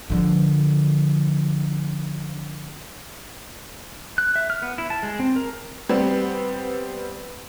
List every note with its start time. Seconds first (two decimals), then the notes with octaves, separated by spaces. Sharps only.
0.10 D3 F3
4.18 F#6
4.36 E5
4.50 F6
4.62 B3
4.78 E4
4.90 A5
5.03 G#3
5.19 C4
5.36 A#4
5.89 G3 B3 C4